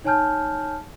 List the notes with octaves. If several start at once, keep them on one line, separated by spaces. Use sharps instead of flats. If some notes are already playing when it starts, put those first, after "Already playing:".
D#4 C#5 G#5 A5 F6 G6